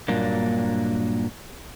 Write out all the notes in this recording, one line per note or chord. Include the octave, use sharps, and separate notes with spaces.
G2 A#2 F#3 A#3 D4